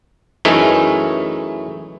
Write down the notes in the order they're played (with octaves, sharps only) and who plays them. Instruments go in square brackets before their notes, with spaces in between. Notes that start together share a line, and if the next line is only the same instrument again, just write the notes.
[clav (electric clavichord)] F#2 E3 A3 C#4 D#4 G#4